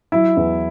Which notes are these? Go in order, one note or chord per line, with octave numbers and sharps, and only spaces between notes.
F#3 E4
E2